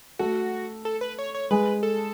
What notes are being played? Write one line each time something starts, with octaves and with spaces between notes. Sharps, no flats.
A3 F#4 A4
A4
B4
C#5
C#5
G#3 G#4 B4
A4